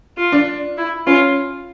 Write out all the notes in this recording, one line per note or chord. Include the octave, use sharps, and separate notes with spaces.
F4
D4
E4
C#4 F4